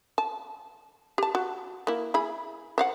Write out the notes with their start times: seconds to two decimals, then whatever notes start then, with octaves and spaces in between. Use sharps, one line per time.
0.18 A5
1.18 G4 A5
1.35 F#4
1.87 A#3 E4
2.14 E4 G#4 B5
2.78 C5 F5 F#5